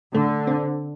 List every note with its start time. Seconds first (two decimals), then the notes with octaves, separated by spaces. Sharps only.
0.14 D3 A3
0.47 C4